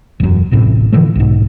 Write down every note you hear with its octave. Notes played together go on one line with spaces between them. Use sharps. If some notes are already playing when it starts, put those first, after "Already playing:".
E1 F#2
D1 A1 A2 C3
D3 E3 F3 A3
B1 G#2